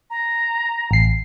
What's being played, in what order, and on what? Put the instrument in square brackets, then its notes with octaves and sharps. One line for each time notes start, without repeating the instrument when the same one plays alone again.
[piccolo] A#5
[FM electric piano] A1 C7